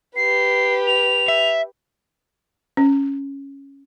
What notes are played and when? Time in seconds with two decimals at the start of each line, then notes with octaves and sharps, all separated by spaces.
0.16 G4 B4 C7
0.87 F7
1.28 E5
2.77 C#4